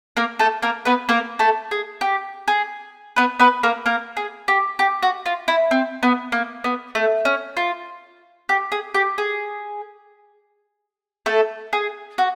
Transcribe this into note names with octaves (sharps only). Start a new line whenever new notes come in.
A#3 A#4
A3 A4
A#3 A#4
B3 B4
A#3 A#4
A3 A4
G#4
G4
G#4
B3 B4
B3 B4
A#3 A#4
A#3 A#4
G#4
G4
G4
F#4
F4
E4
C4
B3
A#3
B3
A3
C#4
F4
G4
G#4
G4
G#4
A3 A4
G#4
F#4